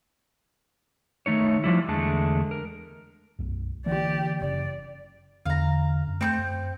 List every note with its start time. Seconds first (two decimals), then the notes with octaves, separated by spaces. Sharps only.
1.26 D#3 A3 D#4 C#5
1.64 F3 G3 E4
1.88 E2 D3 G#3 A3 A5
2.51 A#4
3.39 B1 F#2
3.86 D3 E3 A#3 G4 D5
4.40 F#1 C#3 D5
5.46 E2 D3 F5 A#5
6.08 F#2
6.21 A3 C4 C#6 G6
6.38 F#2